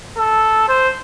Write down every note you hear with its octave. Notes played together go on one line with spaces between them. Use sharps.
A4
C5